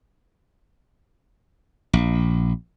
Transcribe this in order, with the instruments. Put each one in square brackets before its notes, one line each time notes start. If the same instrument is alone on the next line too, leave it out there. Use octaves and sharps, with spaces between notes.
[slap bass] A#1